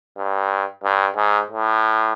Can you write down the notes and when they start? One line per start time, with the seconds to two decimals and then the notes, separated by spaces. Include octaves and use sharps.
0.18 G2
0.84 G2
1.16 G#2
1.50 A2